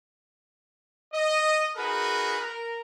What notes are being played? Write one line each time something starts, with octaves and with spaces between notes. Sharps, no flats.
D#5
D#4 F#4 G#4 A#4 B4
A#4